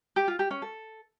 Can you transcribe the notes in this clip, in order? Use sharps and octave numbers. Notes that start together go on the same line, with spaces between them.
G4
F4
G4
C#4
A4